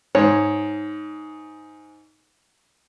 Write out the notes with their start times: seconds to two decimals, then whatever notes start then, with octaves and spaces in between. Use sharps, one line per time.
0.15 G#2 C#5